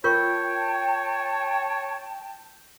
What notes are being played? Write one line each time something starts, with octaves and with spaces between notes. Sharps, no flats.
F4 A#4 C#5 G5 A5 C#6 G6